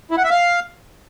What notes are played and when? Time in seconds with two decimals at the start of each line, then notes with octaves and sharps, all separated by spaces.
0.11 E4
0.17 F#5
0.24 E5
0.31 F5